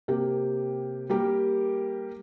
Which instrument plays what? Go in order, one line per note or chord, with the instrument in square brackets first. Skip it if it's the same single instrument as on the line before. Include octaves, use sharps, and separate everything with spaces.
[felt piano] C3 A#3 G4
G3 A#3 G4 A#4